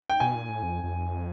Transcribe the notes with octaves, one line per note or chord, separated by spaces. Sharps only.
G5
B2 G#5
A#2
A2
F2
F2